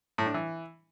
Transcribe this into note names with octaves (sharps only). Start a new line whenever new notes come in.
A2
D4
E3